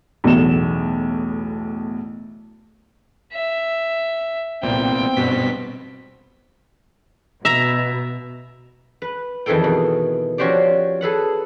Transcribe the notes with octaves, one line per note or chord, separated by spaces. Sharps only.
B1 E2 A2 E7
E5
C2 A#2 B3 C4 G5
G2 B2 B6
B2 E5 A#5
B4
F2 D#3 E3 G#4 A4 G5
B2
F3 C#4 F#4 G4 C5 D5
G#4 A4 B4 F#5